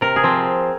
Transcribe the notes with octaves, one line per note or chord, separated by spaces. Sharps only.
C3 A#4
G#4
F3 C4